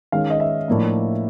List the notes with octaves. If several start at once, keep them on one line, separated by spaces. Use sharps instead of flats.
D#3 G#3 C#4 F5
D#5
E5
A2 F3 A#3 D4